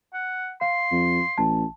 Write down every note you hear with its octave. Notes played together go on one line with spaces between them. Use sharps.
F#5
F5 C6
F2
A1 A5